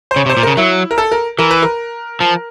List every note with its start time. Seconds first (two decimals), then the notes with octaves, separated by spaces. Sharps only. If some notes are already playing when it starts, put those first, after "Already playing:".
0.11 C5
0.16 C#3 C#5
0.26 C3
0.30 C5
0.37 A#2
0.43 C#3 A#4
0.57 F#3 E4
0.91 A#4
0.98 A4
1.12 A#4
1.38 E3 A#4
1.51 B4
1.62 A#4
2.20 F3